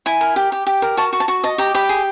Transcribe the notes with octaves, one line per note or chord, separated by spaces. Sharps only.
E4 G#5
A#4
G4
G4
G4
A#4
F#4 A5
F#4
A5
F#4
D#5 A5
G4 A#5
G4 B5
G#4